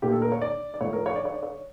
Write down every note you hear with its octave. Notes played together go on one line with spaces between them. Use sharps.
A#2 A3 G4
A4
A#4
C#5
D5
D5
A2 F3 A3 C#5
A#4
C#5
D5
C#5
D5
C#5